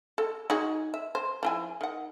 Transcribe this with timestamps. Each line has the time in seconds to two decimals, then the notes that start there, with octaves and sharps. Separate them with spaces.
0.18 A4
0.50 D#4 F#4 G#4
0.94 E5
1.15 C5
1.43 F3 E4 G#5
1.81 D#3 F#5